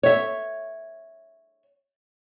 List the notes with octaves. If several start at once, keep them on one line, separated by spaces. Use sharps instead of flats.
C#5 E5